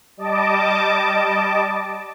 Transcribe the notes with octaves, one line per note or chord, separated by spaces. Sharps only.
G3 D#5 A5 D6